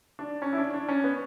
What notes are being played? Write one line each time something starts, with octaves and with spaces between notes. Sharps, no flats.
D4
C#4
E4
D4
D4
C#4
B3